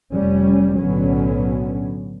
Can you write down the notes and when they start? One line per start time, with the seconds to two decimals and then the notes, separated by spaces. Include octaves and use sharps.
0.12 F1 G3 C#4
0.78 B1 A2 D3 F#3 B3 C#4